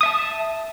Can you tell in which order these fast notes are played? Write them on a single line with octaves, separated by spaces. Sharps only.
D#6 E5 A5